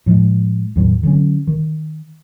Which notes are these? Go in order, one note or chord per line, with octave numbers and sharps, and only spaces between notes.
A2 F3 G3 G#3
E2 A2 D#3 F#3
D3 F#3 C#4
D#3